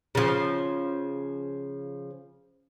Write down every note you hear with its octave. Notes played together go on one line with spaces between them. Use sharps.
C#3 F3